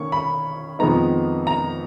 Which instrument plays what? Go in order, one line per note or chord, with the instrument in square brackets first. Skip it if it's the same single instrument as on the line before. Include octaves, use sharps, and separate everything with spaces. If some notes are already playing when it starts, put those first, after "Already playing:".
Already playing: [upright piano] D#3 A#3 C#4 C#6
B5
F2 D#3 G#3 B3 D#4 A#5
A#5